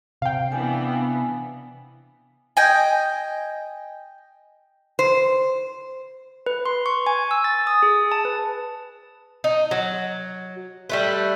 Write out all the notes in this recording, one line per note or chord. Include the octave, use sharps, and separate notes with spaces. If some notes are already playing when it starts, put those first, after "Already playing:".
C3 F5 G5
E3 B3 D4 G#5
D#5 G5 G#5
C5
B4
C6
C#6
G#5
E6
A6
D#6
G#4
A5
B4
D#4
F#3
G3 A3 B4